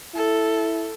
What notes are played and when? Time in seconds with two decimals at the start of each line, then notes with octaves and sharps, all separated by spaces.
0.15 E4 A4